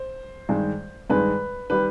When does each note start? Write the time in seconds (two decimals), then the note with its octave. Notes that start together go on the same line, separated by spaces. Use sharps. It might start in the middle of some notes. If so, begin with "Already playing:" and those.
Already playing: C5
0.49 G2 D#3 G#3
1.10 G2 D#3 G#3 B4
1.70 D#3 G3 B4